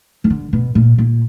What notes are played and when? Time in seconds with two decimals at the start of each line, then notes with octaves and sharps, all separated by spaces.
0.24 D#3
0.30 D3
0.53 B2
0.75 A#2
0.98 A#2